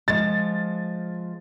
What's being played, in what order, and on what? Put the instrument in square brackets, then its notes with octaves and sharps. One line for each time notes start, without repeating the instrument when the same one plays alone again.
[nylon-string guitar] F3 G#3 [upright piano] A6